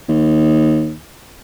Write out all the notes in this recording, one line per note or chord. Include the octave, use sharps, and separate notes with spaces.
D#2